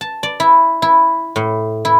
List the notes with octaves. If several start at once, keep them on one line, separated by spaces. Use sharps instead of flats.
A5
D5
E4
E4
A2
E4